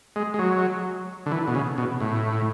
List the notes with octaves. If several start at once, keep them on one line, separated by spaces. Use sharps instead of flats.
G#3
G#3
F#3
D3
E3
B2
C#3
B2
A2